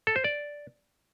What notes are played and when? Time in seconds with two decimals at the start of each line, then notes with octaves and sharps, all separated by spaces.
0.07 A4
0.16 C5
0.24 D5